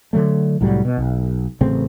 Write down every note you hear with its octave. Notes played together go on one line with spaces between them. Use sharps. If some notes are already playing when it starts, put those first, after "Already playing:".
D3 F#3 A3
C2 A2 F#3 G3
B2
B1
A1 C#3 A3 C4